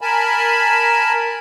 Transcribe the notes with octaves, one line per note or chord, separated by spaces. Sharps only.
A#4 G#5 A5 B5